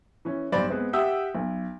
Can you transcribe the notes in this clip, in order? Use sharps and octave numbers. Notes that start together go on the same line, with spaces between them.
E3 C#4
B1 G2 C5 D5 B5
G#3 B3 C4
G4 E5 F#5 G5 D#6 E6
B1